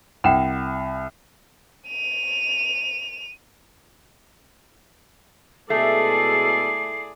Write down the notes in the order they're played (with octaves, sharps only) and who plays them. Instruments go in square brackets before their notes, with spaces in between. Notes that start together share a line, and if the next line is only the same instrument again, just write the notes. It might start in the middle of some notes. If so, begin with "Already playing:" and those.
[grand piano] C2 E7 [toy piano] F#5 G5
[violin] D#7 F7
[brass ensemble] B2 G#3 A4 [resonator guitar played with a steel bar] A3 [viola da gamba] E4 G#4 D5 [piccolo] C7